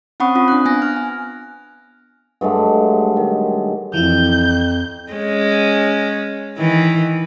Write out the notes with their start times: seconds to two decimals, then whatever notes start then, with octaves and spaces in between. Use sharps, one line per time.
0.20 C4 C#4 F#5 B5 C#6 D#6
0.35 C4 F4 D#6
0.48 D4 F#6
0.65 B3 G#5 F#6 A#6
0.82 F6
0.96 G#5
2.41 G2 F#3 G#3 A3
3.17 D#3
3.94 F2 E3 F3 E4 G6
5.12 G#3 C#4
6.58 D#3 E3